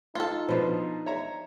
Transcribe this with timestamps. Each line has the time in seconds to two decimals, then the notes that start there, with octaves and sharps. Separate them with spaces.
0.15 D#4 F4 A4 C6
0.49 B2 F3 B3 D4 B4 C5
1.06 C#5 E5 A#5